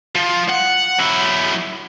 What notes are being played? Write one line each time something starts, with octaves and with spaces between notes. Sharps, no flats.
F3
F#5
F#3 E4